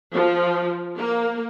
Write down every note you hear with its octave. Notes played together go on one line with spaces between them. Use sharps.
F3
A#3